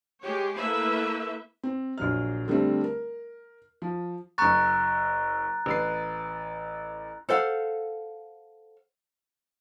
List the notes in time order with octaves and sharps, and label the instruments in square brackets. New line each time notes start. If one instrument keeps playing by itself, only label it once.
[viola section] G#3 G4 C#5
A3 A#3 E4 B4 E5
[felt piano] C4
A#1 F#3 F6
D3 G3 A3 C4
A#4
F3
[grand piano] F#1 C#6 [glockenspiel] A#5 F#6 A6
[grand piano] A1 B4 C7
[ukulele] A4 C5 F5 F#5